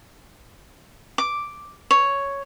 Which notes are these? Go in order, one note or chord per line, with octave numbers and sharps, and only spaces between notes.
D6
C#5